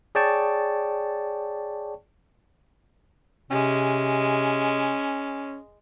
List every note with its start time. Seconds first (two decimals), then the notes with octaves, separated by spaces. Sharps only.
0.15 G#4 C#5 D5 G5 A5 C#6
3.51 C3 G#3 C#4